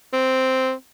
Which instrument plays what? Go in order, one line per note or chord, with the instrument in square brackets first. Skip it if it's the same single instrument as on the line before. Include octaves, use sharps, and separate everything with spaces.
[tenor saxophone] C4